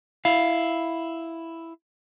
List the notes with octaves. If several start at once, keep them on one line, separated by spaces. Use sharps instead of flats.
E4 F5